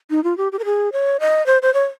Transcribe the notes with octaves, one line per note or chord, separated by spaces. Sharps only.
D#4
F4
G4
G4
A#4
G#4
C#5
D#5
C5
C5
C#5